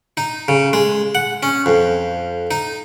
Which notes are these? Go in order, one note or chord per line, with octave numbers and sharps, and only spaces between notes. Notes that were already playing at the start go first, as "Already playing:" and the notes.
D#4
C#3
G#3
F#5
C#4
F2
D#4